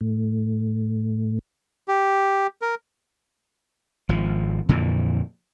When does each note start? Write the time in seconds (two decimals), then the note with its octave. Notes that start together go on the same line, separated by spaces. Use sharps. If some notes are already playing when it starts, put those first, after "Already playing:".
0.01 A2
1.88 G4
2.62 A#4
4.09 G#1 F3
4.69 F2 A#2 D3 E3